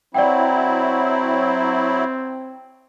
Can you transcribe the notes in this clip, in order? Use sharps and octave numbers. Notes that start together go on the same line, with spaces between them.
F#3 C4 E4 D5 F#5 G5